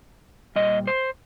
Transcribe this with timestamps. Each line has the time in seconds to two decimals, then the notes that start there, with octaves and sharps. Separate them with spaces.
0.56 A#2 G3 D#5
0.87 C5